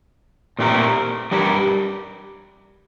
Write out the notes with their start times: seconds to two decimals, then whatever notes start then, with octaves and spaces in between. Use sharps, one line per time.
0.59 A#2 A3 C4 G4 A#4
1.31 G3 D4 G4 A#4